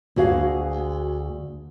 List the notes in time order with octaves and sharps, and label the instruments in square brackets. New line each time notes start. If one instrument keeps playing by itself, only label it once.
[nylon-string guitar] D2 F#4 G#4 F5